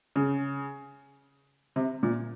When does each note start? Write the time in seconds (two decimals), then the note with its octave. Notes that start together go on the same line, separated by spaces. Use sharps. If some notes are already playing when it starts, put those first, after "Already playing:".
0.16 C#3
1.76 C3
2.03 A#2